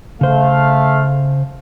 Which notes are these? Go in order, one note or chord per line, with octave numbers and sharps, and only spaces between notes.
C#3 A3 C5 F5